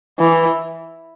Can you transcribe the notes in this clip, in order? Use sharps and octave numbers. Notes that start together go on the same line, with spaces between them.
E3